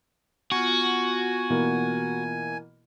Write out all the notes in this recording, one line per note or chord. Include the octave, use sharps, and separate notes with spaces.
B3 F4 F#4 G#5
B2 E3 A#3